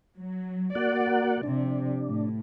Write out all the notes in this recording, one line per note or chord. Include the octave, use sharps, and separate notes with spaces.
F#3
A#3 F#4 D5 F#5
C3 F3 D4
A2